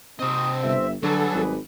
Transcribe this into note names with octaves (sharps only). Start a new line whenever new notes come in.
C3 C4 D#4 D#5 D#6
G1 E5
D3 F#3 G3 G#4 A4 B4
G#1